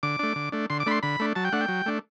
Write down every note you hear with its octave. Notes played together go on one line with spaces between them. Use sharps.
D3 D6
A3 D4
D3
A3 D4
D3 C6
D6
A3 D4 B5 C6
D3 B5
A3 D4
F#3 A5
G5
A3 D4 F#5
G5
F#3
A3 D4